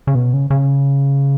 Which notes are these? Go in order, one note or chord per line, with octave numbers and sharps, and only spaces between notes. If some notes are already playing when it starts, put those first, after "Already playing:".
C#3
B2
C#3
C#3